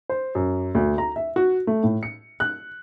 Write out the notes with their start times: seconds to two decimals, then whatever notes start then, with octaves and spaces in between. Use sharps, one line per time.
0.10 C5
0.35 F#2
0.75 D2
0.98 A#5
1.16 E5
1.36 F#4
1.67 A3
1.83 A2
2.03 C#7
2.40 F#6